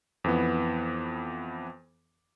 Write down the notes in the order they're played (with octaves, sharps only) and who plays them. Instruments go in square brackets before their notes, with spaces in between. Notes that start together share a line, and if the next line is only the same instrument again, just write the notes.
[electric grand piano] F2 E3 B3